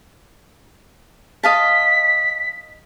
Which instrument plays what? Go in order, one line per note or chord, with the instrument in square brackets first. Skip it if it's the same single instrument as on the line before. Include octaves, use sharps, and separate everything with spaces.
[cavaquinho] D#5 F5 A5 [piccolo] B6